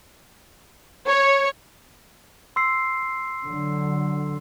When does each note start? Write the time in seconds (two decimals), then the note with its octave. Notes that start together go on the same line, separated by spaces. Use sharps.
1.08 C#5
2.56 C6 E6 C7
3.46 D3 F#3